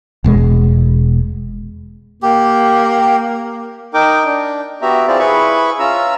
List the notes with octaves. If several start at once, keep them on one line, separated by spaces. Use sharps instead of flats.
E1 B2 G#3
A#3 G4
D#4 A#4 G5 D6
D4
B3 F#4 G4 E5 A#5
C4 E4 F4 G#4 C5 D5
E4 G#4 B4 B5 C#6
C#4 F4 A#5 E6